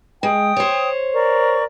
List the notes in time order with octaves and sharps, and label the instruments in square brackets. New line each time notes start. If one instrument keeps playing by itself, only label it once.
[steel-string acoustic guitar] G#3 [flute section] G5 D#6
[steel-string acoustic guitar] C5 C#5
[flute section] A#4 D5 C#6